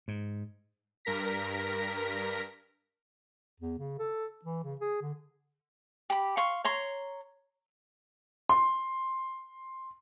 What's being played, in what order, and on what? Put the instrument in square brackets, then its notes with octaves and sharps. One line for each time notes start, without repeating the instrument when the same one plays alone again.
[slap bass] G#2
[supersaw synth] G2 A#4 A#6 B6
[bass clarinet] E2
C#3
A4
E3
C#3
G#4
D3
[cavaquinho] G4 B5
F5 C6 C#6
C#5 A#5 C6
[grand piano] C6